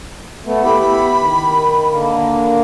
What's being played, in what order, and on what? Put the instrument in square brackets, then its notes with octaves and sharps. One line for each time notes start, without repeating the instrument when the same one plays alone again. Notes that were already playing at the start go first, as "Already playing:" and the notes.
[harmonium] A3 B3
[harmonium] B3 E4 G4 [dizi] B5
[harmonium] D#3
D3 A#3